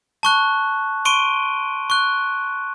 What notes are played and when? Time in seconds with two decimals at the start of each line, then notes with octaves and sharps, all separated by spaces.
0.23 A5 C#6 F#6
1.05 C6 C#6 D7 D#7 G7
1.90 C#6 F#6